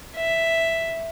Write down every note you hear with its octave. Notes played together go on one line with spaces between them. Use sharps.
E5